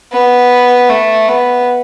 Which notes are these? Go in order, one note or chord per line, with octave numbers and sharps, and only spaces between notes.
B3
A3
B3